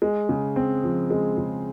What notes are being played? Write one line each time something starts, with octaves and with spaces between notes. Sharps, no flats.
G#3
C#3
C4
F3
G#3
C#3